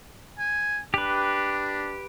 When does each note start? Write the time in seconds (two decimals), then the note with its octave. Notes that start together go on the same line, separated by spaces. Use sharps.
0.39 G#5
0.94 D4 G4 B4